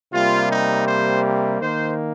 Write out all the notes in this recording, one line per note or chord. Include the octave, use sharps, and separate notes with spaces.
C3 G3 A#3 F4
D#4
C5
D#3 A#3 C5